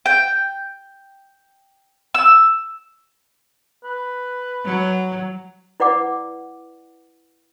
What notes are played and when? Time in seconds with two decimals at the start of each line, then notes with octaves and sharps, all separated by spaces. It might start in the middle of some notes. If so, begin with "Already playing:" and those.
0.06 G5
2.14 E6
3.84 B4
4.65 F#3
5.80 E4 B4 D5 F#5 D6